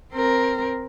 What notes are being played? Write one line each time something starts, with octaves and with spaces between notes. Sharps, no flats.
C4 A#4